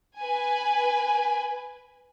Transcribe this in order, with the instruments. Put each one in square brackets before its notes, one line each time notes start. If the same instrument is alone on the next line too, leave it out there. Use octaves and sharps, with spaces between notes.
[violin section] B4 G#5